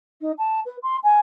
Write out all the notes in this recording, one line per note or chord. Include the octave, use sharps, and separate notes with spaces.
D#4
A5
B4
C6
G#5